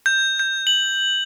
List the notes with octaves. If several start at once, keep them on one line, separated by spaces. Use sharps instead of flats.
G6
G6
F#7